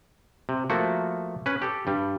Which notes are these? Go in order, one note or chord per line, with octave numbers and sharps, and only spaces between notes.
C3
F3 A3 A#3 F#4
C#4 B4
G4 A4
G2 G3